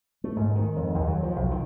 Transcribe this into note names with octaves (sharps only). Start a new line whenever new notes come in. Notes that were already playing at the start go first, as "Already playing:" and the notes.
A3
G#2
D#3
F2
D#2
F#3
F3
B1
D#3